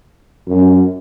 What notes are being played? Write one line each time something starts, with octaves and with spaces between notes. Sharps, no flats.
F#2